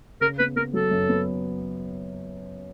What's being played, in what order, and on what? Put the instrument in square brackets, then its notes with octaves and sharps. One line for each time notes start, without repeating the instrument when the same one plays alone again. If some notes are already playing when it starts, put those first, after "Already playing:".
[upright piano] C#3 [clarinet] A#4
[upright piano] B3 [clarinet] B4
[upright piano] B3 [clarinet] A#4
[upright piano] F#3 [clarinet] A4
[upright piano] F#2
B3